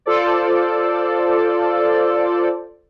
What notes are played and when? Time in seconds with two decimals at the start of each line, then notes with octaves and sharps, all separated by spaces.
0.06 F4 A4 C5 D5